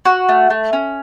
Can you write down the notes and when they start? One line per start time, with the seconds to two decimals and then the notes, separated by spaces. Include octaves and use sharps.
0.05 F#4
0.29 A3
0.50 A3
0.73 C#4